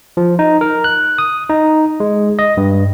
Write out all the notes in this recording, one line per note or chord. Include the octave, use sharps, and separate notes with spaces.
F3
D#4
A#4
F#6
D#6
D#4
G#3
D#5
G2